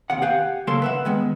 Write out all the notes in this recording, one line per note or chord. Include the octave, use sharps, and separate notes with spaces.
D#2 C3 F#5
G4 F5 F#5 G#5
C#3 F#3 A#3 A4 C6
B4 E5 F#5
D#3 G#3 B3